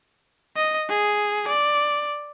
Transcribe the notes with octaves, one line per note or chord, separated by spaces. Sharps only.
D#5
G#4
D5